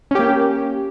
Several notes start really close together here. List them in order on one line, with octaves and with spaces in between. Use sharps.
C#4 G4 A#3